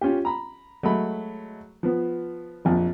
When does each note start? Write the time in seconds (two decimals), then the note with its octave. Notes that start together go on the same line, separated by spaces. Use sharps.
0.01 C#4 F4 G4
0.25 A#5 B5
0.83 F#3 G#3 A3 B5
1.83 F3 B3
2.65 A#1 F2 A#2